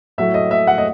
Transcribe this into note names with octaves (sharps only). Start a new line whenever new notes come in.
A2 F#3 A3 E5
D#5
E5
F#5
D#5